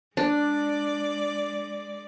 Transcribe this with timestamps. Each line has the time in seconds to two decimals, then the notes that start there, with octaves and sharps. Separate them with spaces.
0.17 G#3 D4 D5